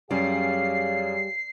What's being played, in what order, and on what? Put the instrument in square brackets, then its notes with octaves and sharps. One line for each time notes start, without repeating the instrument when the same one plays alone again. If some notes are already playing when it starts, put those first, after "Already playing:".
[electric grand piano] F#2 C#4 D5 [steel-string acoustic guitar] G3 [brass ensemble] G#4 C#5 F5 [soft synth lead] C7